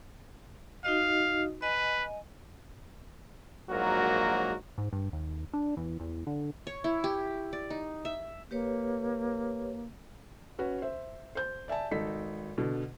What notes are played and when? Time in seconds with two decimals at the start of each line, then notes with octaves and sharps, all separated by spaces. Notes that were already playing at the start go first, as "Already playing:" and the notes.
0.85 D#4 F#4 D#5 F5
1.62 B4 D#5 G#5
3.70 A#1 G#2 F#3 A#3 F#4 A#4
4.78 G#2
4.93 G2
5.13 D#2
5.54 D4
5.77 E2
6.00 E2
6.27 D3
6.67 C#5
6.84 E4
7.04 G4
7.53 D5
7.70 D#4
8.05 E5
8.51 A#3 G4 B4 C#5
10.59 C#4 F#4 B4
10.82 C5 E5
11.35 C5 G6
11.68 D5 E5 G#5 A5
11.91 G#1 D#4 A4 B6
12.58 B2 D3